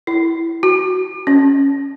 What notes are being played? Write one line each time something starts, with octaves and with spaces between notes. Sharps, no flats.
E4
F#4
C#4